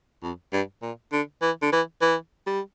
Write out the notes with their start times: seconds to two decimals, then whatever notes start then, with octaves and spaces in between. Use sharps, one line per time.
0.23 F2
0.53 G2
0.82 A#2
1.12 D3
1.42 E3
1.62 D3
1.72 E3
2.02 E3
2.47 G3